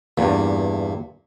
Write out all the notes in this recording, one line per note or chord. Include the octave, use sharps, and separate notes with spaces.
E2 G2 A#2